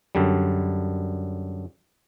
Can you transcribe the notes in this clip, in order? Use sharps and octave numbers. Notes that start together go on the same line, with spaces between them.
F#2 D3 G3